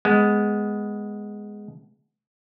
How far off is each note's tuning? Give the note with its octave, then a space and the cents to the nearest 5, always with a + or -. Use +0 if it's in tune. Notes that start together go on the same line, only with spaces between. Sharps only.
G#3 +0 B3 +0